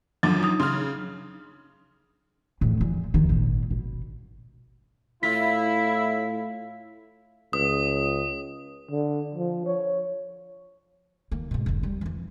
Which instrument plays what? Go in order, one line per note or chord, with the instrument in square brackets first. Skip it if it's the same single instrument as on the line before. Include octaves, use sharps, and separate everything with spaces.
[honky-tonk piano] F#2 D3 F3 [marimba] F#3 D4
[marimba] D#4 D#6
[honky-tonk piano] C#3 F6 [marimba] C6
[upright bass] E2 A2
E2 F3
D#2 D#3
G#1 A#2
B2
[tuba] A2 [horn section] E4 [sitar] F4 [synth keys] B6
[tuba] C#2 [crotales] D#6
[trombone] D3
F3
C#5
[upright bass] D#3 A#3
G#2 B2
F1 D3
G3
E3 F3